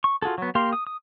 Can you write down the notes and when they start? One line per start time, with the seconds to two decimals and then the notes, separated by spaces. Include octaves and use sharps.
0.04 C#6
0.22 F4 F#4 G#4 A4
0.38 F#3 B3
0.55 A#3 G4 F5 C6
0.73 D#6
0.87 D#6